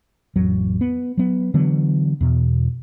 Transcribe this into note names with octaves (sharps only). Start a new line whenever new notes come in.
A1 F2 F#3
B3
F#3 B3
D3 E3 F#3 B3
E2 B2